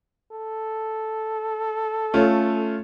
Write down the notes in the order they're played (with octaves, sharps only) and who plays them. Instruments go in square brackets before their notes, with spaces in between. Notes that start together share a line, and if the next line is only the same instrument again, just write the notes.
[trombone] A4
[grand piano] A3 C#4 F4